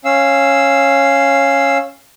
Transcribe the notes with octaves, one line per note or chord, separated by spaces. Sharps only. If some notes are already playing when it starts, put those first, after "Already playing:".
C#4 F5 E6